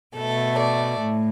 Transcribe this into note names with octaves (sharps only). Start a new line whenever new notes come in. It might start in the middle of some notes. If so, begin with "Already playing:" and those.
B2 A3 A4
D5
A2